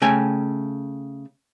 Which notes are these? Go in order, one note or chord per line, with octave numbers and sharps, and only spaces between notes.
C#3 A3 G5 G#5